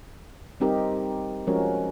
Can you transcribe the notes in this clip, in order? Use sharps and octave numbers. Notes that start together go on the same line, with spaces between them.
G3 C4 D#4 G4 A#4
F3 G#3 C#4 F#4 A#4